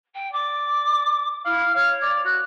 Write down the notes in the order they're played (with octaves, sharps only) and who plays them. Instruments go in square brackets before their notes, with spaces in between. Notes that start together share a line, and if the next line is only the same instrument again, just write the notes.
[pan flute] G5
[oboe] D5 [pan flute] D6
[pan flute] E4 [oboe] F5
[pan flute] C#5 [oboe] F5
[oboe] D5
[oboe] F#4 [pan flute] F#6